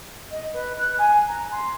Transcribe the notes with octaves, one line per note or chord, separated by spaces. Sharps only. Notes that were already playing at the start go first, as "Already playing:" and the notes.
D#5
B4
F#6
G#5
A#5
C6